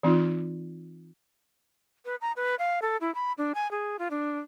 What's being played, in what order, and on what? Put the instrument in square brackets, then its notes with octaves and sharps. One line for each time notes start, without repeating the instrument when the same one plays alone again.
[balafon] E3 C4 D#4 F4
[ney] B4
A#5
B4
F5
A4
E4
B5
D4
G#5
G#4
F4
D4